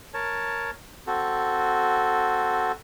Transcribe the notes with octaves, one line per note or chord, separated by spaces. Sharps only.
A#4 C#5 A5
C4 F#4 A4